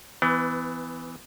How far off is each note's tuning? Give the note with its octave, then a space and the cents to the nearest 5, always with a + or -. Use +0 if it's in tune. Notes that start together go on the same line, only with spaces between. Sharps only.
E3 +0 B3 +30